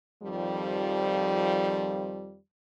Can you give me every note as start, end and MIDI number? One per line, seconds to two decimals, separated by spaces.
0.23 2.38 41
0.23 2.38 51
0.23 2.38 53
0.23 2.38 55